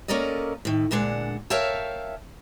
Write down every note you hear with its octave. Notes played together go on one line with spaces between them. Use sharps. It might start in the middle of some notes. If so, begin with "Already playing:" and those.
A#3 C#4 A4 A#4 D5 D#5
A2 D#3
D2 A#2 G#3 D4 F#5
A#4 C#5 E5 F5 G5 A5